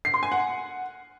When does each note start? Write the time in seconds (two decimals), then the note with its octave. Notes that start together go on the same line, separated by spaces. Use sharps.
0.05 C7
0.14 C6
0.23 G#5
0.32 F#5